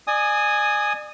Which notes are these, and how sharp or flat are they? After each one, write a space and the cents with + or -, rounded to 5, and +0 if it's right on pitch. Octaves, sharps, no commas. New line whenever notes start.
D5 +40 G#5 +0 D#6 +0